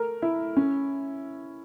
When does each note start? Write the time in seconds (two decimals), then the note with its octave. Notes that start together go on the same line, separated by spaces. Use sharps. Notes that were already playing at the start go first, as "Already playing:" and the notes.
Already playing: A3 A#4
0.22 E4
0.57 C#4